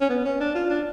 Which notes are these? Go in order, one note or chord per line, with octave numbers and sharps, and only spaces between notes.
C#4
B3
C#4
D4
F4
D4